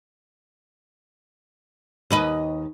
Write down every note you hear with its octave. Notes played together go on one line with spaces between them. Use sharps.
D#2 B4 D#5